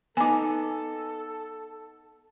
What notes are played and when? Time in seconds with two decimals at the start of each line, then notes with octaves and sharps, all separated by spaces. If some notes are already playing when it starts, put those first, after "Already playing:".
0.17 B3 D#4 A4 G#5 D6